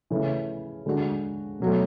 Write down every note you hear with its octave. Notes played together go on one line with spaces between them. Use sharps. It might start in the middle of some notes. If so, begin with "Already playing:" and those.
C#3 E3 A3
D3 G#3 D4 F#4
B2 F#3 A3